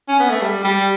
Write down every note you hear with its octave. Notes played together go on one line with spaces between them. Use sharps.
C#4
B3
A3
G3
G3